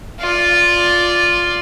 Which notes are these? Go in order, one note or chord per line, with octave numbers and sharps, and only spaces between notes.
F4 D5